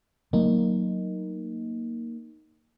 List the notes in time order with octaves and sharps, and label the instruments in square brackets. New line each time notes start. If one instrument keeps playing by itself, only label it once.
[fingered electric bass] F#3 A3 [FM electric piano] A#3 D#4